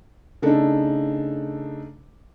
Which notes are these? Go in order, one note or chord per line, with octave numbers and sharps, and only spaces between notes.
C#3 A3 D4 D#4 A4